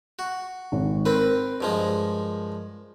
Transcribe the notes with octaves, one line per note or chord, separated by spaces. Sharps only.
F#4
G#1
C4 A#4 B4
G2 F3 G#3